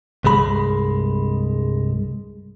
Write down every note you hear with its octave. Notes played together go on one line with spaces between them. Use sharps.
C2 G2 G#3 B5